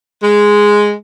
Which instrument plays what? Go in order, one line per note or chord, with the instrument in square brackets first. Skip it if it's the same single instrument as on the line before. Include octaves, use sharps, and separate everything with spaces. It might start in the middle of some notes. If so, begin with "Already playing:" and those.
[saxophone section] G#3